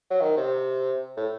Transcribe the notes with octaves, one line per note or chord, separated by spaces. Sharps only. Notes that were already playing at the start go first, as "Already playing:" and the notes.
F#3
D#3
C3
A2